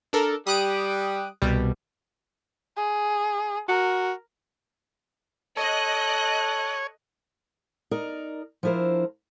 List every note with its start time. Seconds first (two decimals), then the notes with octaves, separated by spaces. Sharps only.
0.13 D4 A4 A#4
0.47 G3 G4 D#6 F#6 D7
1.42 C2 B2 G3
2.77 G#4
3.69 F#4 A#4
5.57 A4 C#5 D#5 F#6
7.91 D#4 A#4 D5
8.63 F3 D4 E4 A#4 C5